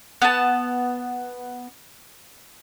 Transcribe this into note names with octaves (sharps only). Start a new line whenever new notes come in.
B3 A5